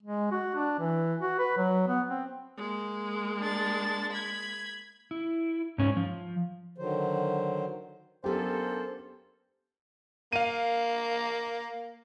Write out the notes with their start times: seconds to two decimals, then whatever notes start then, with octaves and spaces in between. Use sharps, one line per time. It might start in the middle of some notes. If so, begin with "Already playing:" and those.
0.03 G#3
0.31 F#4
0.55 D4
0.79 E3
1.21 F#4
1.39 B4
1.57 F#3
1.88 B3
2.09 C4
2.57 G#3 A#3
3.39 D4 A6
4.12 B5 G#6
5.11 E4
5.78 G#2 C#4
5.97 F3
6.78 D3 D#3 F#3 C5
8.24 F#3 A#3 B3 C#4 D4 G4 A4 C5
10.33 A#3 F5 D#7